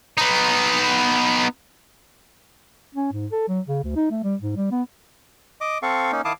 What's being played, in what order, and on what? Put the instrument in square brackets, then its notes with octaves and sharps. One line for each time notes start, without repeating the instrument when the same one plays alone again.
[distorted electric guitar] B3 D#4
[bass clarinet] C#4
G#2
A4
F#3
C#3
D2
D#4
A3
G3
G#2
G3
B3
[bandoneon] D#5 D6
C4 A4 F5 C#6
A#3 C#4 D#4
D#3 E4 F5 A5 D6 D#6